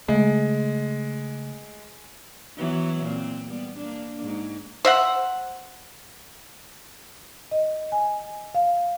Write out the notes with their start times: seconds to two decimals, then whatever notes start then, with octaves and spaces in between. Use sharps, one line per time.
0.08 C#3 G#3 A3
2.57 E3 F#3 B3
3.03 A#2 C4
3.47 G3 B3
3.76 A#3 D4
4.22 G#2
4.85 C5 E5 F#5
7.51 D#5
7.92 G#5
8.55 F5